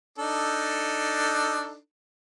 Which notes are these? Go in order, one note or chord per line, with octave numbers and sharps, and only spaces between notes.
D4 D#4 A4